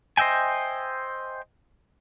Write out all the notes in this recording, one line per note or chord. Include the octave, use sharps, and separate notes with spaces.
C5 D#5 E5 G5 G#5